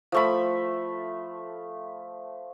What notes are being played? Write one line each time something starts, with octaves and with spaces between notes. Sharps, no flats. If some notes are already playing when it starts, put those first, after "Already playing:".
F3 A3 B5